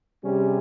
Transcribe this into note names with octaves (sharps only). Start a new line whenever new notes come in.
C3 G3 C#4 G#4